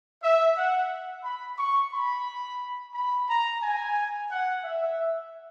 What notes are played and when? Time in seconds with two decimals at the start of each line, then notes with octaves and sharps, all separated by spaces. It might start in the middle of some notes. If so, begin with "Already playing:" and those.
0.22 E5
0.56 F#5
1.23 B5
1.57 C#6
1.92 B5
2.93 B5
3.28 A#5
3.62 G#5
4.30 F#5
4.63 E5